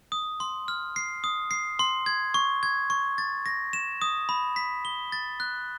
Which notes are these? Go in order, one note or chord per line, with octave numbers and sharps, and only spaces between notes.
D#6
C6
F6
C7
D#6
C7
C6
G#6
C#6
G#6
C#6
A6
A#6
E7
D#6
B5
B6
G7
A6
F#6